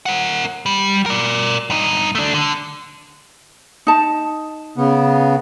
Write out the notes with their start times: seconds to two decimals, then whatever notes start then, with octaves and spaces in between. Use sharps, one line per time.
0.06 A#4 F#5
0.66 G3
1.06 A#4 D5
1.70 G2 D#4
2.15 A3 D4
2.34 D3
3.87 D#4 A5
4.77 C#3 B3